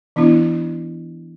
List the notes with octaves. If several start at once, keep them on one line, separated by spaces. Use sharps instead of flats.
E3 B3 D4 E4